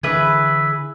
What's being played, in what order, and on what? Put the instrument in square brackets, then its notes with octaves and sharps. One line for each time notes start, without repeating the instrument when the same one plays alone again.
[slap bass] D3 E3 [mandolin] G#4 B4 E5